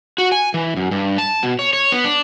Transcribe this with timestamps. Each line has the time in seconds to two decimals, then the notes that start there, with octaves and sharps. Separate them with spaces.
0.18 F#4
0.32 G#5
0.54 E3
0.77 F#2
0.91 G2
1.18 A5
1.43 B2
1.59 C#5
1.73 C#5
1.92 B3
2.04 D4